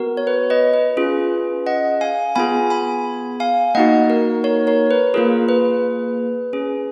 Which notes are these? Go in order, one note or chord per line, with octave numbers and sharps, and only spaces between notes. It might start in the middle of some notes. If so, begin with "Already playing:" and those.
Already playing: B3 F#4 A#4
C#5
B4
B4 D#5
B4
C#4 F4 G#4
D#5 F#5
F5 G#5
B3 F4 G#4 G#5 B5
G#5 B5
F5 G#5
A#3 D#4 F#4 D#5 F#5
A#4
A#4 C#5
A#4 C#5
B4
A#3 F4 G#4 A#4
B4
C#4 G#4